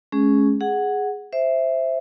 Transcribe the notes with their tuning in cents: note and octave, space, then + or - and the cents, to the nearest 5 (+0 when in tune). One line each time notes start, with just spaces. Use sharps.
G#3 +35 C#4 +0 G#4 +0
G#4 +0 F#5 +0
C5 +0 E5 +0